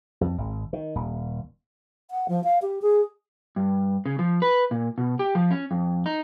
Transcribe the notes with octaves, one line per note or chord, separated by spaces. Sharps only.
F2
G#1
D#3
D#1
F#5
F3
F5
G4
G#4
G2
C#3
F3
B4
A#2
B2
G4
F3
C#4
F2
D#4